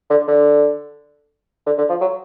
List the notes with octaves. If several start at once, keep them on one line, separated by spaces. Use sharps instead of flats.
D3
D3
D3
D3
F3
F#3